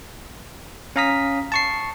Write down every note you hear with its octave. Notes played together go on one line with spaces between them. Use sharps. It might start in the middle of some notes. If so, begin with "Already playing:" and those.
C#4 F5 A#5 D#6 B6
A5 C#6 C7